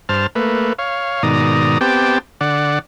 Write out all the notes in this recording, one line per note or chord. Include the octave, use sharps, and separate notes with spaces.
G2 C5 A5 F6
A3 A#3 B4
C#5 F5
G#2 B2 D#3 D5 A#5 D#6
B3 C4 G4 G5 A5 D6
D3 D5 F#5